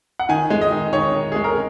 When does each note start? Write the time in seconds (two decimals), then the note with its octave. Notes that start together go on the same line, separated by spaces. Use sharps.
0.19 F#5
0.29 D#3 G#5
0.50 G#3
0.61 D#5
0.71 D#3
0.93 D#3 C#5
1.15 D#3
1.32 G#3 G#4
1.44 A#4